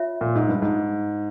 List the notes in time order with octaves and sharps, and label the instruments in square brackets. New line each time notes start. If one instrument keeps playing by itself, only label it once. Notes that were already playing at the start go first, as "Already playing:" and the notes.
Already playing: [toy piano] F4 C#5 E5
[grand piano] A#2
G#2
G2
G#2